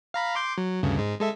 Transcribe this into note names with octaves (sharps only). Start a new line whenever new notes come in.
F5 A#5 B5
C6 D6 G6
F#3
D2 G2 C#3
G#2 G#3
G#3 A4 E5